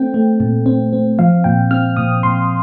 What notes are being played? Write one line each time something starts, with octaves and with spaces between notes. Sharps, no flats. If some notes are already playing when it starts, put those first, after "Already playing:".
Already playing: A3 C4 G5
A3
A#2
C4
C4
F3 F5
A#2 G5
C4 F6
A#2 D#6
A#2 C6